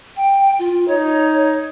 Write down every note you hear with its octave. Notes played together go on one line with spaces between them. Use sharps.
G5
F4
D#4 C#5